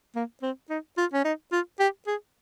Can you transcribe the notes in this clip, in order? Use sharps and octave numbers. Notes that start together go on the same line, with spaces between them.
A#3
C4
D#4
F4
C#4
D#4
F4
G4
G#4